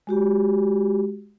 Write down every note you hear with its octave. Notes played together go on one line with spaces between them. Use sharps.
G#3 F#4 G4